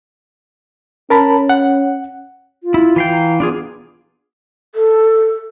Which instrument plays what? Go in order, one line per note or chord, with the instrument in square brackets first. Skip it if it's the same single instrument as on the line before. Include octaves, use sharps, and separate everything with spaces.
[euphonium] C#4 [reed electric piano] A#4 A5 B5
[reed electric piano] F#5
[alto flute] F4
[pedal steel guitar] E4
E3 F5 G5
[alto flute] A#5
[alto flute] B3 [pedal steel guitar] D4 F4 G#4
[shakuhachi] A4